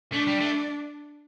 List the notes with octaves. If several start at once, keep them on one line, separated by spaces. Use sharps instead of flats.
A3 D4
G3
A3